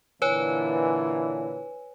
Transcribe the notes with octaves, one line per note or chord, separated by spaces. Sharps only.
A#2 D3 E3 B4 C#5 G#5